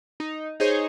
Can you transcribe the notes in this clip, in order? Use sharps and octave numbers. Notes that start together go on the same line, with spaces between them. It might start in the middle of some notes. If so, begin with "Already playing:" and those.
D#4
D#4 G#4 C5 C#5